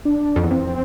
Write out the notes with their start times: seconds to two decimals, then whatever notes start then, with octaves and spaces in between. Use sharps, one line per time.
0.05 D4
0.36 F2
0.43 E2
0.51 F2 C4